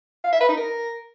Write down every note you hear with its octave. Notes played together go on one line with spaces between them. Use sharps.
F5
E5
B4
D#4
A#4